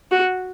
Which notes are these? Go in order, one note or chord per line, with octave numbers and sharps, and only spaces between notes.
F#4